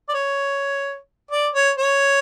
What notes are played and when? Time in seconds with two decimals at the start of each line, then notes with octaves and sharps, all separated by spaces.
0.09 D5
0.14 C#5
1.31 D5
1.54 C#5
1.78 C#5